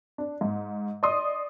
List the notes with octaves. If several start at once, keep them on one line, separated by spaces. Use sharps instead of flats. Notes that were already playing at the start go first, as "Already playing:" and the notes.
D4
G#2
D5 D#5 C6 D#6